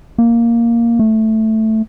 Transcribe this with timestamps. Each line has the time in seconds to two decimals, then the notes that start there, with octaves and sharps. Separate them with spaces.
0.18 A#3
0.99 A3